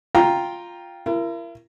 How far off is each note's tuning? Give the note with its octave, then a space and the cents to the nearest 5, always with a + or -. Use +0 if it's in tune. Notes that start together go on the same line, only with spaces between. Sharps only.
F4 +0 G5 +0 A#5 +5
E4 +40 A#4 +0